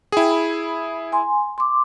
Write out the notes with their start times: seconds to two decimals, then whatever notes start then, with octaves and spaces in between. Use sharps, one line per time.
0.12 E4 G#4 G5
0.31 B5
1.12 G#5 C6
1.58 C6 D6